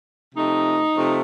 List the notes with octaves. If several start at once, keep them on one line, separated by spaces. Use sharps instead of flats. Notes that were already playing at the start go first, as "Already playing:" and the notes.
C3 F3 A3 D#4
C3 F3 A3